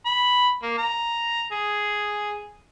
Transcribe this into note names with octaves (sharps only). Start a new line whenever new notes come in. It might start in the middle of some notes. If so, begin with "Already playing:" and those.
B5
A#3
A#5
G#4